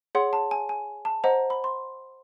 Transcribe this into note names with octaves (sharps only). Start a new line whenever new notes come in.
G#4 C#5 F#5 C6
A5
G#5
G#5
A5
C5 D#5 F#5 A#5
B5
C6